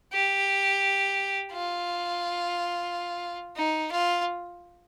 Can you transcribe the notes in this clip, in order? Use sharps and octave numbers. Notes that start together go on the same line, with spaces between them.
G4
F4
D#4
F4